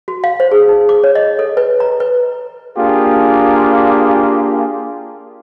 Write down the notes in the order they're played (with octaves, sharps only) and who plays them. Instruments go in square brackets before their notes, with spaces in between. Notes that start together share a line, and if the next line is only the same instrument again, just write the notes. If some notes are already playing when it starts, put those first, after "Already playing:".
[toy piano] F#4
F5
C5
G#4
D#4
D6
C#5
D#5
A4
B4
A#5
B4
[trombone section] A#3 D4 F4 G4 G#4